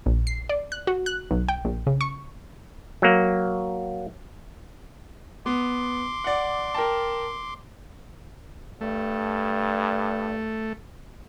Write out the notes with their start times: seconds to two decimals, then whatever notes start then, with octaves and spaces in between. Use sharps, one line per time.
0.06 A#1
0.27 C7
0.49 D5
0.72 F#6
0.87 F#4
1.06 F#6
1.31 B1
1.49 G5
1.65 A#1
1.87 C#3
2.01 C#6
3.02 F#3 A#3
5.46 B3 C6 D6
6.24 D5 F#5
6.74 A#4 G5 A5
8.81 G2 A3